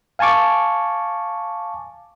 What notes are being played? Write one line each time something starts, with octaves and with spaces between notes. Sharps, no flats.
F5 G#5 A5 C#6 D6